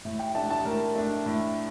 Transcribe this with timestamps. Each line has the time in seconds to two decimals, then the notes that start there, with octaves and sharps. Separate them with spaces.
0.05 A2
0.19 G5
0.35 A3 D4 A5
0.50 A5
0.65 A2 A#4
0.95 A3 D4
1.26 A2